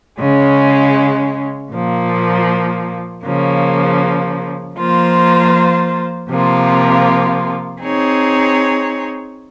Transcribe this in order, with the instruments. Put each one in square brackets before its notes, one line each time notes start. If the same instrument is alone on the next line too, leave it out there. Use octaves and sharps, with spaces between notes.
[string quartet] C#3 G#3 C#4
A#2 F3 A#3
C#3 F3 A#3
F3 A#3 F4 C5
C3 F3 A#3 F4
C4 D#4 G#4 C#5